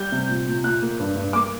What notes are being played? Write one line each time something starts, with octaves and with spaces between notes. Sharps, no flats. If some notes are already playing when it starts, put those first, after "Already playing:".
Already playing: G3 G6
C3
A#2
A#2
A#2 F#6
A#3
G2
G2
A#3 D6